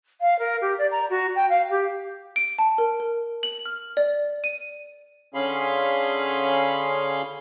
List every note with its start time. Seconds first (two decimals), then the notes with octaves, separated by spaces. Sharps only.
0.20 F5
0.38 A#4
0.61 G4
0.78 D5
0.91 A#5
1.10 F#4
1.35 G5
1.49 F5
1.70 G4
2.36 D7
2.59 A5
2.78 A#4
3.00 A#4
3.43 F#7
3.66 F6
3.97 D5
4.44 D#7
5.34 D3 C#4 G#4 F5 B5 C6